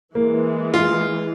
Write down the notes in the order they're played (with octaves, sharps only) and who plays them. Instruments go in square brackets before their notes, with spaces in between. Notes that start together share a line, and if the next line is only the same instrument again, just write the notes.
[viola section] E3 G#3 [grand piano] A#3
[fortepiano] F4